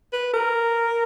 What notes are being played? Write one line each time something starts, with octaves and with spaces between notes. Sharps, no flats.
B4
A#4